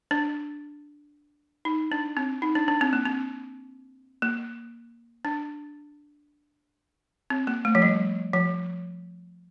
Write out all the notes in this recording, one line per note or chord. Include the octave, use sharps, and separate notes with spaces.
D4
D#4
D4
C4
D#4
D4
D4
C4
A#3
C4
A#3
D4
C4
A#3
A3
F3
G3
F3